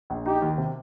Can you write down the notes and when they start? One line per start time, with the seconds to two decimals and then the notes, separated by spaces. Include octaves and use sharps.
0.10 A#1
0.26 D#4 G4
0.42 D#2
0.58 C3